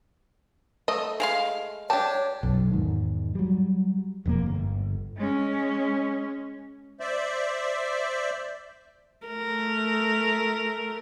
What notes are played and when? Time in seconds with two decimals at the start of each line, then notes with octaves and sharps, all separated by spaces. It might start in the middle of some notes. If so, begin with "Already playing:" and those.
0.88 A3 D#5
1.20 G#3 F5 C6
1.90 D4 G4 C#5 A5
2.43 B1 F#2
2.71 E2 G#2 D#3
3.35 F#3 G3
4.26 E1 F2 E3 A#3
4.46 G1
5.17 G#3 C#4
7.00 C5 D5 E5
9.27 A3 A#4